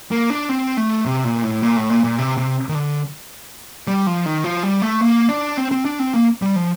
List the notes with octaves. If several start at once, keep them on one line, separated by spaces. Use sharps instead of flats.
A#3
D4
C4
A3
C3
A#2
A2
A#2
A2
A#2
A#2
C3
C3
D#3
D3
G3
F3
D#3
F3
G3
A3
A#3
D4
C4
C4
D4
C4
A#3
G3
F3